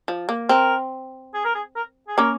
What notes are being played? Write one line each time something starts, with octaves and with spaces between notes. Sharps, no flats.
F3
A#3
C4 A#4
G#4
A#4
G#4
A#4
G#4
A#3 C#4 A#4